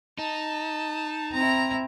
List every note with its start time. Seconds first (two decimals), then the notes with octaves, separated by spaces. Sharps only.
0.19 D#4 A5
1.33 C4 E4 A#5